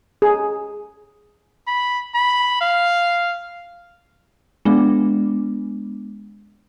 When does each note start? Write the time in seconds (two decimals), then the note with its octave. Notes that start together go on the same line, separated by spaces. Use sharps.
0.22 G#4
1.67 B5
2.15 B5
2.61 F5
4.65 G#3 B3 D4